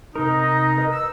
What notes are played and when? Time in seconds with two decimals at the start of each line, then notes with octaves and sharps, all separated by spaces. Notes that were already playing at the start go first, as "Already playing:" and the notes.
0.16 C3 D#4 A#4
0.77 A#4 B4 D#5
0.92 E6